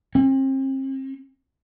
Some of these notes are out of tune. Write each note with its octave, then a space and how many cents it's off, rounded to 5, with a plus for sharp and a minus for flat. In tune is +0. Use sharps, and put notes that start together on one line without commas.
C4 +40